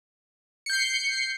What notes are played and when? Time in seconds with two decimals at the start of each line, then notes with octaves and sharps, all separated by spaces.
0.66 C#7
0.70 G6
0.73 C7